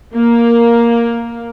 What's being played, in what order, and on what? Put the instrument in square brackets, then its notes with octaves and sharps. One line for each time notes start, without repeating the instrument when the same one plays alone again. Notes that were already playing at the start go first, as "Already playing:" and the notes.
[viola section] A#3